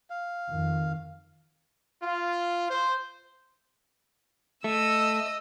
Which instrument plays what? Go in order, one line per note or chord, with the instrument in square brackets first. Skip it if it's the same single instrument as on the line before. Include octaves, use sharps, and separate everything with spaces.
[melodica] F5
[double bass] F2 D#3
[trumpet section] F4
C5
[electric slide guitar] A3 [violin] D#5 E6